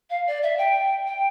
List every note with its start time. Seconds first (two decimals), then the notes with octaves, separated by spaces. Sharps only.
0.10 F5
0.27 D5
0.43 E5
0.58 G5
1.07 G5